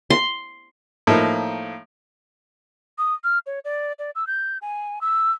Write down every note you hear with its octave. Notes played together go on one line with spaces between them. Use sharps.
C6
A2 F3 A#3 D#4
D#6
F6
C#5
D5
D5
E6
G6
G#5
E6